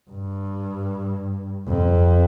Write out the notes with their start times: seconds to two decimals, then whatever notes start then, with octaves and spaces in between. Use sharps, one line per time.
0.11 G2
1.67 F2